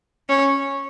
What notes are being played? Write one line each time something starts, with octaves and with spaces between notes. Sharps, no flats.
C#4